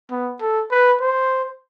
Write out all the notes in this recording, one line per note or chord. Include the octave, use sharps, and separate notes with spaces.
B3
A4
B4
C5